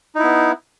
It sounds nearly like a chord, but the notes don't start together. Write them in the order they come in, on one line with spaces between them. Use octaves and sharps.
D#4 E4 B3